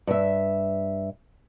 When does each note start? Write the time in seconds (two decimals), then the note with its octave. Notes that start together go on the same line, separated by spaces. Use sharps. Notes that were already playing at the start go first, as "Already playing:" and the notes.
0.07 G2 E5